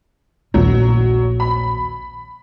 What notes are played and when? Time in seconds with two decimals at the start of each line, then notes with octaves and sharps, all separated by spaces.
0.54 A#1 D#2 A#2 F#3
1.40 B5